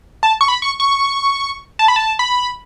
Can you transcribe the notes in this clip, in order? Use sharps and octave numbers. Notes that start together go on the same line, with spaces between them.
A5
C#6
B5
C#6
C#6
A5
B5
A5
B5